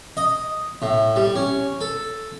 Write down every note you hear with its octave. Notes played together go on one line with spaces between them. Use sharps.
D#5
A2
G3
C#4
A4